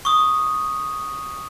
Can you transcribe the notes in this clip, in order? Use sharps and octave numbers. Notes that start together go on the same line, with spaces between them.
C#6 D#6